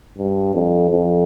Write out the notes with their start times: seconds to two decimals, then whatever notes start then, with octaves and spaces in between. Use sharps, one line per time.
0.17 G2
0.55 F2
0.91 F2